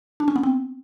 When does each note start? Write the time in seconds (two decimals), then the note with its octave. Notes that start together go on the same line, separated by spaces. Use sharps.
0.20 D4
0.28 C#4
0.36 B3
0.43 C4